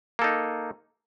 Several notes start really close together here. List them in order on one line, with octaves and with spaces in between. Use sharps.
A#3 A4 D#4